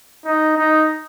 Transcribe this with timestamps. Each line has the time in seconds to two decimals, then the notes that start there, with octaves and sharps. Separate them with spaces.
0.25 D#4
0.57 D#4